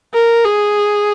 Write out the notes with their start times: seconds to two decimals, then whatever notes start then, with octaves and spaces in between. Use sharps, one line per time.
0.14 A#4
0.45 G#4